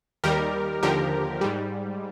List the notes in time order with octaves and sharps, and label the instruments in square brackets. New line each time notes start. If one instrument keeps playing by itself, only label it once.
[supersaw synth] D#2 D#3 G3 G4 A#4
D#2 D3 F3 G4 A#4
G#2 G3